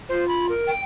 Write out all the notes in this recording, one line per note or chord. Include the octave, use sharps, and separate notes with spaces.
F4 C5
B5
A#4
G5